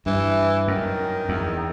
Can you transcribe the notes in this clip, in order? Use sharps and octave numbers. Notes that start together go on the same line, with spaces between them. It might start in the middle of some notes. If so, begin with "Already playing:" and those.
G2 E3
F#2 D#3
E2